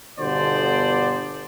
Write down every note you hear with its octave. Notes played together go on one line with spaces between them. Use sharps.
G1 B2 D3 B3 C5 D5